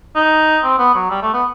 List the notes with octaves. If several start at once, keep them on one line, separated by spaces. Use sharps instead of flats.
D#4
C4
B3
F#3
G3
A3
B3